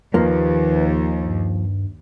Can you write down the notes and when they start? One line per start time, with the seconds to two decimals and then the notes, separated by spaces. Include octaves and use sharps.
0.14 D#2 F3 A#3 B4
1.22 G2